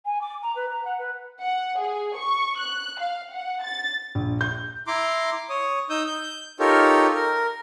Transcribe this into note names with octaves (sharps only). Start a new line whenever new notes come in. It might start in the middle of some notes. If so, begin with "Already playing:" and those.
G#5
D6
A#5
B4
A#5
F#5
B4
F#5
G#4
C#6
F#6
F5
F#5
A6
A#1
G6
E4 A#5 C6 D6
C#5 D#6
D#4 D#6 E6 G6
G6
D#4 F4 G4 A4 A#4 C#5
A#4